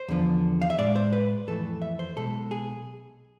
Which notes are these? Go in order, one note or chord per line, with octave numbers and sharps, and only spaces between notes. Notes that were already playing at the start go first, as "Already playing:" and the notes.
Already playing: C5
E2 D3 F3
F5
E5
A2 G#3 D5
C5
B4
F2 E3 A3 A4
E5
C5
B1 B2 G#3 A4
G#4